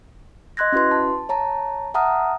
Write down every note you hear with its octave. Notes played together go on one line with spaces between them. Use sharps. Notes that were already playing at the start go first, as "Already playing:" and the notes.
D#5 C6 F#6 G#6 A#6
C#4 E4 F#4 B4 C6
A5
C#5 A5 A#5
E5 F#5 A5 A#5 D#6 F6